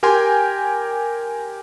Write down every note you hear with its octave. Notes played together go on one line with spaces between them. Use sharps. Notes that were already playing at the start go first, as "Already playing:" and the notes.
G4 A#4 G5 G#5 C6